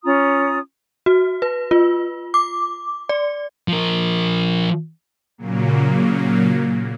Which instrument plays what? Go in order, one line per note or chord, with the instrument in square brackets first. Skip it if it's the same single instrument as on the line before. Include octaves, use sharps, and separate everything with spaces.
[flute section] C#4 F4 A#5 D#6
[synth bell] F#4
B4
F4
D6
D5
[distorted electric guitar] F3 A#4
[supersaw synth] A#2 C#3 F#3 A#3